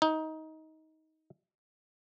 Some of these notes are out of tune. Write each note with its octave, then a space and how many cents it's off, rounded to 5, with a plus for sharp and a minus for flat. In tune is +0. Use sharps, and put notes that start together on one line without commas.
D#4 +20